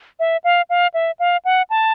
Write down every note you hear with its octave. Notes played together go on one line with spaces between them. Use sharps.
E5
F5
F5
E5
F5
F#5
A5